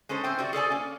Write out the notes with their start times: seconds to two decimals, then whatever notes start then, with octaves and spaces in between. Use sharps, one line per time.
0.09 G#3 C#4 A4 C5
0.24 A2 C4 C5 G5
0.39 C3 G3 F#4 D5
0.53 G#4 A4 D5 G#5
0.70 A#3 C#4